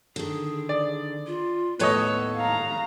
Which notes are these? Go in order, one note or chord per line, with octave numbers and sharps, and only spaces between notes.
D3 D#3 G#4
D5
F4
D#2 A2 B3 A4 B4 C#5 D#5
F5 A#5